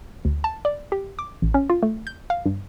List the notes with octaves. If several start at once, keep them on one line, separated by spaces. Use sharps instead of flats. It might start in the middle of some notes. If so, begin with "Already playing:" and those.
D2
A5
D5
G4
D6
A1
C#4
F4
A3
G6
F5
G2